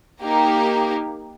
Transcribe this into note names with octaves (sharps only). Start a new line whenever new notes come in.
A#3 D#4 G4 A#4